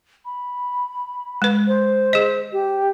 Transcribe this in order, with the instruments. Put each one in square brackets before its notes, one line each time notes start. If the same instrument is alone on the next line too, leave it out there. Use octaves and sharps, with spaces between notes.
[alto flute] B5
[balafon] G#3 B4
[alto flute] C5
[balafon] G#4 D#5
[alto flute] G4